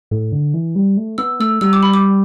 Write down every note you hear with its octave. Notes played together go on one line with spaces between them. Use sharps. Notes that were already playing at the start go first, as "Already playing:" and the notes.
A2
D3
E3
G3
A3
B3 E6
A3 E6
G3 E6
D6
B5
D6